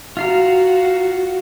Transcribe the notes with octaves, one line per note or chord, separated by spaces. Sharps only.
F4 F#4 F5 A#5